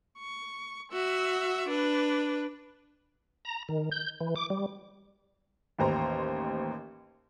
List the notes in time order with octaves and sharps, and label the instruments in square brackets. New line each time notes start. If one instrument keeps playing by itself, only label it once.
[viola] C#6
F#4 E5
D4 B4
[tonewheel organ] A#5
D#3
G6
E3
D6
G3
[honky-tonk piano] A1 D#2 C5 A#5